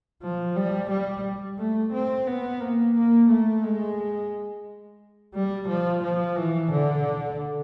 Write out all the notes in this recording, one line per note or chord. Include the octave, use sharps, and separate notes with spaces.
F3
G3
G3
A3
C4
B3
A#3
A#3
A3
G#3
G3
F3
F3
E3
D3